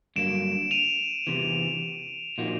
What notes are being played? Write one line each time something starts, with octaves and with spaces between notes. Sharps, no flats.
G2 D3 F#3 A#3 D7 E7
D#7 F7
E2 C3 E3
A#2 F3 A#3 D#4 F#4